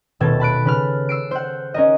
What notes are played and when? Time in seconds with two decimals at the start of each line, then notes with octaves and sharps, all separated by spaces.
0.20 D#1 B2 A4 G#6 A6
0.40 A5 B5 F#6 D7
0.65 C#3 B4 F6
1.09 E6 C7 D7
1.31 C5 F#5
1.74 C#4 A#4 D#5